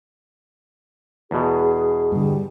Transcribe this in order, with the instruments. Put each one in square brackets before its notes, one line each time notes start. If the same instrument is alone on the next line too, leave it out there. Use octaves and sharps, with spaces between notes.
[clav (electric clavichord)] E2 B2 [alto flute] G#4
[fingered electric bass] G2 D3 [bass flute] G3